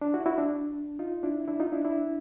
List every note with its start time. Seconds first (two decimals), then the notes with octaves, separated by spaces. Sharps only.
0.01 D4
0.14 E4 F#4
0.26 E4 F#4
0.38 D4
0.99 D#4 F4
1.23 D4 E4
1.48 D4 E4
1.60 D#4 F4
1.72 D4 E4
1.84 D4 E4